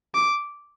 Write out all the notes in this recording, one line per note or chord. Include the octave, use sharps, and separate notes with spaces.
D6